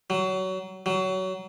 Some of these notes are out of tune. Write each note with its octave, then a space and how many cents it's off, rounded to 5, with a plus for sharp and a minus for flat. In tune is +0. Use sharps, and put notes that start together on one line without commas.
F#3 +25
F#3 +25